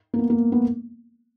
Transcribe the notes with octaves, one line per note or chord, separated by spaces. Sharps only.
A#3
B3
A#3
B3